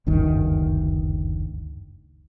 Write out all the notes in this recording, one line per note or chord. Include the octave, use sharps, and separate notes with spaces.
F#1 D2 G2 D#3